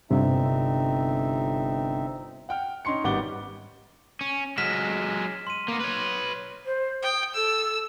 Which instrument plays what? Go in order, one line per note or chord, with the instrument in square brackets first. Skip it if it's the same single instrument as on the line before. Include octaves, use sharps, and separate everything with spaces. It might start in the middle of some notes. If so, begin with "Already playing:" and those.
[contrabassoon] G1 [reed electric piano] G2 C3 [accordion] C4 D#4 E5
[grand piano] F#5 G5 F6
C#4 D#4 C6 C#6 C#7
G#1 G3 B3 F#5 D6 G7
[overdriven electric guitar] C#4
[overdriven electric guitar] F#3 G#3 [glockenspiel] F6 B6 E7
[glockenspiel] C6 D#7
[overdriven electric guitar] A#3 B3
B4 C#5
[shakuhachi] C5
[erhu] G5 [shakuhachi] D#6
[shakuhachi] A4 [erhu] E6